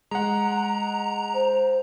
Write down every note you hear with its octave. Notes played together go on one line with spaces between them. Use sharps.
G#3 F#5 A#5
C5